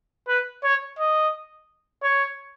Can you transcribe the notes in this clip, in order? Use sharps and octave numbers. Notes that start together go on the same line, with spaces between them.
B4
C#5
D#5
C#5